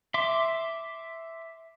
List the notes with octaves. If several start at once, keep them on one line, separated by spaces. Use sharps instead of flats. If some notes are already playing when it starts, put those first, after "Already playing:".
E5 C6 D6